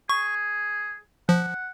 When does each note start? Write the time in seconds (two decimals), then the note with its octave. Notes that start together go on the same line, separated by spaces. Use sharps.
0.09 G#4 C#6
1.29 F3 F#5